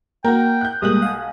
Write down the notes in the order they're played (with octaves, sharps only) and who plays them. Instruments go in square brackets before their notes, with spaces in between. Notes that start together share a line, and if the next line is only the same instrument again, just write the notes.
[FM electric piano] A#3 [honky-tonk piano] F#4 A#4 [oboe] G5
[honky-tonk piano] F#6 G6
[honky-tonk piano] B1 F#6 F#7 [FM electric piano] G3 G#3 A#3 [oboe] D#6
[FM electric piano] F5 F#5 G#5